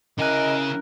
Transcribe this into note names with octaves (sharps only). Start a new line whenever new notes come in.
C#3 C#4 E4 A#4 D#5 G#5 F#6